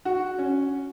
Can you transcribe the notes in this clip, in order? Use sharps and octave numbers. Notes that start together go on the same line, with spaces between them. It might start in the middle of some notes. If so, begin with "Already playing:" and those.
F#4
C#4